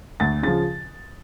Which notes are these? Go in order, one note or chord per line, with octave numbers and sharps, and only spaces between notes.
D2 A6
C#3 F3 A6